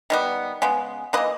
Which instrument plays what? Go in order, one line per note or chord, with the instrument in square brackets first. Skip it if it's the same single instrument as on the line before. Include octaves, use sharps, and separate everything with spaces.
[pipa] D#3 G3 B3
C#3 G#3 B3
E3 A#3 B4 D#5